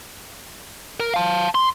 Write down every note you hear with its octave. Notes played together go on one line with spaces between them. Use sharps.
A#4
F5 A5
C6